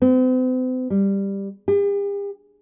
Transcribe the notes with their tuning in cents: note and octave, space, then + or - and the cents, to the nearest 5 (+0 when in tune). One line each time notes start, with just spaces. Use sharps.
C4 -45
G3 +10
G4 +45